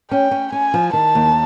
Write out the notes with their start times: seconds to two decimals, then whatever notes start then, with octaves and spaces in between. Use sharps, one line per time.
0.11 C#4 G5
0.31 C#4
0.52 C#4 G#5
0.74 F3
0.93 D#3 A5
1.15 D#2